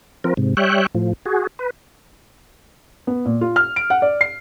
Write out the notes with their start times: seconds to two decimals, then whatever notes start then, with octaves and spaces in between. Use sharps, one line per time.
0.24 F3 C4 A#4
0.37 G#2 C3
0.57 G3 C#5 E5 G5 F#6
0.95 A2 F3
1.25 F#4 G#4
1.59 B4
3.07 B3
3.25 A#2
3.41 F4
3.56 F6
3.76 D7
3.90 F#5
4.02 D5
4.21 C7